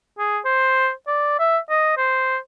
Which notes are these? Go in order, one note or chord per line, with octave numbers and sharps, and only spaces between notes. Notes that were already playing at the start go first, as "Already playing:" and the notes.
G#4
C5
D5
E5
D#5
C5